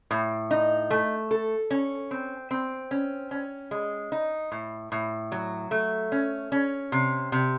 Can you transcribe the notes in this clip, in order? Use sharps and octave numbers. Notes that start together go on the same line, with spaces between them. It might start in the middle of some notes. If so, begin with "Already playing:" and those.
A2
D#4
A3
A4
C#4
C4
C4
C#4
C#4
G#3
D#4
A2
A2
F#3
A3
C#4
C#4
C3
C3